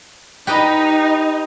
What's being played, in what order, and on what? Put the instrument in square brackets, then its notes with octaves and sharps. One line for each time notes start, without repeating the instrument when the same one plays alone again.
[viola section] D#4 [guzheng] G4 B4 D#5